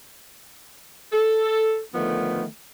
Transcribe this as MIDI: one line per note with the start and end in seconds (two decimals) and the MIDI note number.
1.12 1.80 69
1.94 2.45 50
1.94 2.45 51
1.94 2.45 53
1.94 2.45 57
1.94 2.45 59